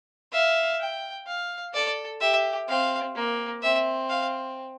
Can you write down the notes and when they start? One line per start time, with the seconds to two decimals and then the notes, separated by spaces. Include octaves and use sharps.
0.32 E5 F5
0.79 G5
1.27 F5
1.74 A4 D5
2.21 G4 E5
2.68 C4 F5
3.15 A#3
3.62 C4 E5
4.10 F5